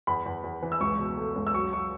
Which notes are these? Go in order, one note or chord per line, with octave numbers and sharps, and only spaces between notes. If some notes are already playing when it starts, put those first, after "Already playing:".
E2 B5
E2
E2
E3
E6
C#2 C#6
B2
A3
C#2
E6
F#3 C#6
F#3 C#6